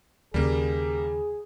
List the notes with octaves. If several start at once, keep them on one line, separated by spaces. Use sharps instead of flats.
D#2 C#3 G3 A#3 G#4